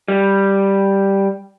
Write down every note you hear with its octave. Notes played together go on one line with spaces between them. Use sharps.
G3